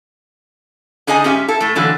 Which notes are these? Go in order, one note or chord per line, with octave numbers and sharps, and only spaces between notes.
D3 D#4 G#4 D#5 G#5
G#2 C#4 G4 E5
E4 A4
A2 A3
A#2 D3 E3 F#3